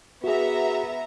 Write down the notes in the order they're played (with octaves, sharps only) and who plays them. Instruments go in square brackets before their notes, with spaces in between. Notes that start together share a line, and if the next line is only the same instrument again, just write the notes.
[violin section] B3 E5 A#5 [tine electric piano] F#4 G#4